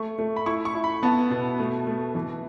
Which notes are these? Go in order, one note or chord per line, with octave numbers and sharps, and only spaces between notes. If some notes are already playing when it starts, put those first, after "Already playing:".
Already playing: A3 C#6
A3
B5
E4 C#6
C#6
E4
B5
B3 A5
B2
A3
A3
E3